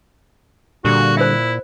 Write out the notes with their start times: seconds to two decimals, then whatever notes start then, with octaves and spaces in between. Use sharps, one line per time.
0.85 A#2 D3 G3 F#4
1.17 E4 C5 E5